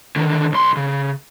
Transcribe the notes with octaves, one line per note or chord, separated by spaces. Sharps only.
D3 D#3
B1 C6
C#3